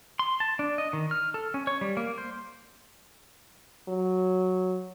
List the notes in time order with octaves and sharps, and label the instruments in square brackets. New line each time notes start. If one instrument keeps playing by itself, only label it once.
[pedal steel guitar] C6
A5
D4
D#5
D#3
F6
A4
C#4
C#5
G3
A#3
C5
[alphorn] F#3